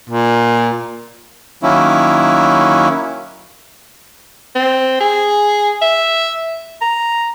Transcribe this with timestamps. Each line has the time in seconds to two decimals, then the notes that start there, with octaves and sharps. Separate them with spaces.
0.10 A#2
1.63 D#3 F#3 A#3 C#4 E4
4.55 C4
5.00 G#4
5.82 E5
6.81 A#5